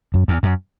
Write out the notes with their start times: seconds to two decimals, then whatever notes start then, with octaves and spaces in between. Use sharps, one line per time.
0.14 F#2
0.28 E2
0.43 F#2